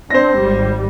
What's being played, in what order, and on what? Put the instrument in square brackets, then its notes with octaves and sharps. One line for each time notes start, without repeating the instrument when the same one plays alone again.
[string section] C4 D4 [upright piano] C5 A#6
[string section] G#1 G3